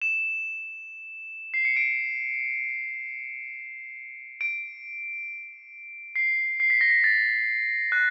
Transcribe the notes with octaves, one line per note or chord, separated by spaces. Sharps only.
E7
C7
C#7
D7
D7
C7
C7
B6
A#6
B6
A6
F#6